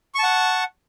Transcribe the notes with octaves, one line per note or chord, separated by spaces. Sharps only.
F#5 A5 C#6